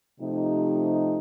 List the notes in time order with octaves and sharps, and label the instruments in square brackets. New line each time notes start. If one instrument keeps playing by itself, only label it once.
[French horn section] C3 F3 A3 D#4 G4